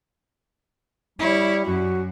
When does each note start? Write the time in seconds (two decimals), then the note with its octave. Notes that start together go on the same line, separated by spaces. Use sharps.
1.19 G3 E4 C#5
1.65 F#2 F#4